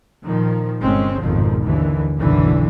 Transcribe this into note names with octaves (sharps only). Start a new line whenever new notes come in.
A#2 D#3 F3
G1 G#3 C4 C#4
G#1 F2 B2 D#3 F3
D#2 D3 E3
F#1 B1 F#2 B2 D3 E3